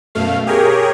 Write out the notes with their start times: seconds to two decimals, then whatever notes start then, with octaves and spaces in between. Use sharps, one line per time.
0.15 F#2 B2 A3 F5
0.47 G4 G#4 A#4 C#5